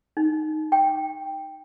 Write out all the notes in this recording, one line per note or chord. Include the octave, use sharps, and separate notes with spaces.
D#4
G5